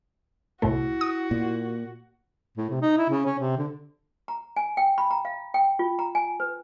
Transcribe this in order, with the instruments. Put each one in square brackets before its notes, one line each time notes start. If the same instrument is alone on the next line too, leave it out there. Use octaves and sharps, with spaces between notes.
[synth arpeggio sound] C2 A2 A3 [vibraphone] E4 [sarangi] F#4
[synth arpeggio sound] D#6
[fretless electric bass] A#2
[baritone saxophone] A2
C3
D#4
E4
C#3
C#4
C3
D3
[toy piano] A#5
G#5
G5
B5
A#5
F5
G5
F4
A#5
G#5
B4